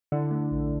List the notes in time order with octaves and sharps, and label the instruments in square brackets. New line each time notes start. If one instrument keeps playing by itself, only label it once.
[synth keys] D3 [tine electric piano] E4
[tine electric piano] A3
A#1